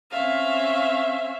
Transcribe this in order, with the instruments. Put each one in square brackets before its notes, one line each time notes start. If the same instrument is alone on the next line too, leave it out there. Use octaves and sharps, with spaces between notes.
[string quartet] C4 C#4 E5 F5